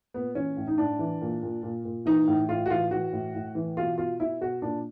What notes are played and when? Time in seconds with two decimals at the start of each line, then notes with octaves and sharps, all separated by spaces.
0.14 A#2 B3
0.35 E3 C#4
0.57 A2
0.67 D#4
0.78 A2 D4
0.99 E3
1.21 A#2
1.42 A#2
1.63 A#2
1.85 A#2
2.06 E3 D#4
2.27 A2
2.48 A2 F4
2.66 F#4
2.70 E3 F4
2.91 E3 F#4
3.13 A2
3.35 A2
3.55 E3
3.77 B2 F4
3.98 B2 F4
4.20 B2 E4
4.41 B2 F#4
4.62 A#2 D4